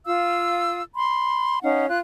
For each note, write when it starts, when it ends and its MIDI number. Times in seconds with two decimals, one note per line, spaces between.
0.06 0.81 65
0.06 0.81 77
0.06 0.81 88
0.95 1.58 83
0.95 1.58 84
1.63 1.86 61
1.63 1.86 63
1.63 1.86 77
1.63 1.86 78
1.89 1.99 65
1.89 1.99 90